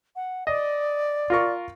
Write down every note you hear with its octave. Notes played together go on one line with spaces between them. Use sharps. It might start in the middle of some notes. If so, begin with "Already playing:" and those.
F#5
D5 D#5
F4 A#4 C#6